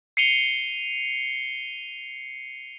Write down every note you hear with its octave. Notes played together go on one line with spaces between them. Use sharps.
C7 C#7 D#7 F7 G7